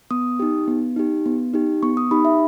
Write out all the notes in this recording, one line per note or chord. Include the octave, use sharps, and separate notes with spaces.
B3 D#6
D#4 G4
B3
D#4 G4
B3
D#4 G4
B3 C#6
D#6
D#4 G4 B5
E5